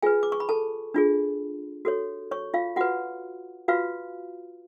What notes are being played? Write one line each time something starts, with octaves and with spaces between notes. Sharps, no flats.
F4 G#4 B4 G#5
D6
C#6
B5
A4 A5
D4 F4 G#4
F#4 A4 C#5
C#5 C#6
F4 F5
F4 F#4 B4 F#5
F4 F#4 B4 F5